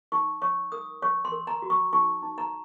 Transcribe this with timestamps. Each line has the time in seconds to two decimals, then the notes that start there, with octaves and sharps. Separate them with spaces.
0.12 D#4 C#6
0.42 C#5 C#6
0.72 A#4 D#6
1.02 C#5 C#6
1.25 C6
1.32 A#4
1.47 A#5
1.62 F#4
1.70 C#6
1.93 D#4 C#6
2.22 D#4
2.38 A#5